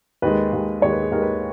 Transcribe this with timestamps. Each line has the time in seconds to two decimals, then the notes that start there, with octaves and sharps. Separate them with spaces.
0.22 D#2 D#3 G#3 B4
0.52 D#2 D#3 G#3
0.82 D#2 D#3 G#3 C#5
0.92 B4
1.02 G#4
1.11 D#2 D#3 G#3 A#4
1.22 B4